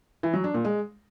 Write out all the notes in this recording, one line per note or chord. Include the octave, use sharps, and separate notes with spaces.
E3
F#3
D4
A#2
G#3